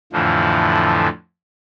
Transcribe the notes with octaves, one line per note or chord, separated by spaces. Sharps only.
F2 A2 D3 E3 F3